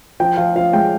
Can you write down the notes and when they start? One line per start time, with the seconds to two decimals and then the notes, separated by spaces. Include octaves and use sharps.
0.20 F3 G5
0.37 F3 F5
0.56 F3 F5
0.73 G#3 G5